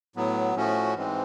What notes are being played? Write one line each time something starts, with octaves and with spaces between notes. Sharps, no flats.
A2 F#3 B3
A2 F3 A3 C#4 F#4
G#2 E3 G#3 C4